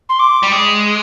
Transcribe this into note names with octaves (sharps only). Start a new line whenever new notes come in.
C6
D6
G3
G#3